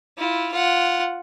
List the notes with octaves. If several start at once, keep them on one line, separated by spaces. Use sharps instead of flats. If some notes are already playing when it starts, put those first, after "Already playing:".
E4 F4
F4 F#5